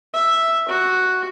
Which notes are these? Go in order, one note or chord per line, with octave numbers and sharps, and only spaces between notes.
E5
F#4